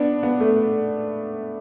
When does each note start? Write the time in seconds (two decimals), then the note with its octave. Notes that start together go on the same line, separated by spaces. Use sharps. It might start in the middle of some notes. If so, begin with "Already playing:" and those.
Already playing: B3 D4
0.23 B3
0.40 A3